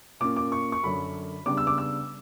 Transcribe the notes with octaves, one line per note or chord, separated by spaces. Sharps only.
A#2 A#3 C#4 D6
D6
C#6
C#6
F#2 D3 F#3 B5
C#3 G3 B3 D4 D6
E6
D6
E6